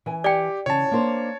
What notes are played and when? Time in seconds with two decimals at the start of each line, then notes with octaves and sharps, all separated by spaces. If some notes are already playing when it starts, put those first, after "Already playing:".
0.06 E3 G#5
0.24 G4 D5 G5
0.66 C#3 E3 C#5 A5
0.91 A#3 D4 C5